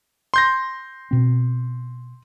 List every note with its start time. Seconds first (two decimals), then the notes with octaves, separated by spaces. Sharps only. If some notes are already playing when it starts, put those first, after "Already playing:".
0.34 C6 G6 A#6
1.11 B2 C4